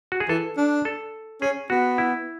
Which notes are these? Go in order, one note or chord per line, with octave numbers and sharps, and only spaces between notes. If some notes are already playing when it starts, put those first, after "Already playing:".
F#4
G#4
E3 A4
D4
A4
C#4 G#4
B3 F#4
E4